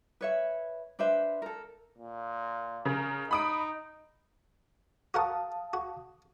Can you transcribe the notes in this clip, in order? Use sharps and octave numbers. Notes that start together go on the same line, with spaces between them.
B4 C#5 E5
D4 B4 C5 E5
A4 A#4
A#2
C#3 A#4
D#4 B5 D#6 D7
F#4 A#4 F5 F#5 A5 D#6
F#4